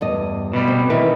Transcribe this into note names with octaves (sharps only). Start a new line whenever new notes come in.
E2 G2 D#5
B2 G3
C4
D#3 E3 D#4 E4 B4